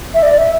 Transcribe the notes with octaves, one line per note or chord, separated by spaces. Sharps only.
E5
D5
E5